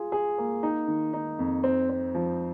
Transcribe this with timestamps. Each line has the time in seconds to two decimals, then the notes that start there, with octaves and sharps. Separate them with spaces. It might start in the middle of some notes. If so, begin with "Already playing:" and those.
Already playing: F4 G#4
0.12 G#4
0.38 A#3
0.63 D#4
0.88 D#3
1.13 D#4
1.39 F2
1.64 C4
1.89 C4
2.15 F3